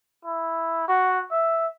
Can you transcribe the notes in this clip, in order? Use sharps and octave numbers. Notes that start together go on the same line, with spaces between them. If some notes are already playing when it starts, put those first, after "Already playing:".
E4
F#4
E5